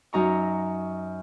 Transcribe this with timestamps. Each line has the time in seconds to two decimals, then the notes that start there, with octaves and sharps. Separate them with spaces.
0.13 F#2 F#3 D#4 A#5 C#6